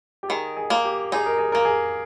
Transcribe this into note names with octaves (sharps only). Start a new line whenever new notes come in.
G4
D#3 G#4
G#4
A#3
G4
D#4 G#4
A#4
G#4
A#3 A#4
G#4